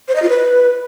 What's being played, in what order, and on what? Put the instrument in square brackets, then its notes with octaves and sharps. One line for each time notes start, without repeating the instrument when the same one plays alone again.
[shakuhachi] C5
D#5
F4
B4